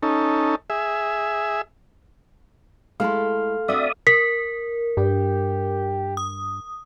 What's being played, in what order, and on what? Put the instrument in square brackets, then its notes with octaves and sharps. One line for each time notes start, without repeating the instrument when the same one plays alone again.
[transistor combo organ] C#4 D#4 A4
G#4 E5
[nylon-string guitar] G#3 E4 [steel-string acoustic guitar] A3 [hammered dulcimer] F5 A5 C6
[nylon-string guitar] C4 D4 F#4 [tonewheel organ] D5 E5 D#6
[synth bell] A#4 [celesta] B6
[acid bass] G2 [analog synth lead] G4
[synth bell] D#6